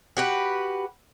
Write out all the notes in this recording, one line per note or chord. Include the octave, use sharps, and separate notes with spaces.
F#4 G4 B4